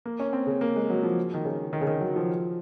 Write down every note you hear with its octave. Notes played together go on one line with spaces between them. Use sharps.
A#3
C#4
C4
C#3
A#3
G#3
F#3
F3
D#3
C#3
D#3
C#3
D#3
F#3
F3